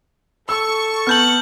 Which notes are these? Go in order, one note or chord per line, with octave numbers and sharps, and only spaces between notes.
A4 C#6 E6
B3 A5 F6 G6 F#7